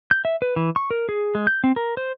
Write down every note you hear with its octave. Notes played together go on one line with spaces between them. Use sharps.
G6
E5
B4
E3
C#6
A#4
G#4
G#3
G6
C4
A#4
C5